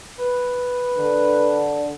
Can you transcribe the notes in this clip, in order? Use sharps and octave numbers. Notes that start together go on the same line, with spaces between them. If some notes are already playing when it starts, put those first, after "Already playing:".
B4
D3